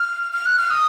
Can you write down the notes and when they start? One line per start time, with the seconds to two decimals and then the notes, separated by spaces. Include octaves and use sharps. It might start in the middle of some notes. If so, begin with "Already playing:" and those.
Already playing: F6
0.33 F6
0.46 F#6
0.57 F6
0.70 D#6